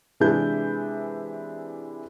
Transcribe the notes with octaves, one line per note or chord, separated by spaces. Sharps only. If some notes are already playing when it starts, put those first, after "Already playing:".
C3 E3 G#3 D4 E4 G6